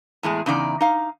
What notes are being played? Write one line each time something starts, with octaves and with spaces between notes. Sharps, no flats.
E2 A2 G#3 G#4
E2 C#3 D#4 D5 A#5
D#4 F5